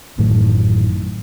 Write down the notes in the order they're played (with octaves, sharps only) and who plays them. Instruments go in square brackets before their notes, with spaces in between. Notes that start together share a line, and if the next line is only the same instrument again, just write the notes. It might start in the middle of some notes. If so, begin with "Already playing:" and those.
[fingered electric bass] A1 F#2 A2 D#3